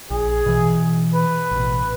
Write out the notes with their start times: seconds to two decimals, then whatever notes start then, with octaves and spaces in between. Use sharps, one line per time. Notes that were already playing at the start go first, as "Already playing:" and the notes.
0.10 A#1 G#4
0.46 B2 E3
1.15 B4
1.51 A1 B2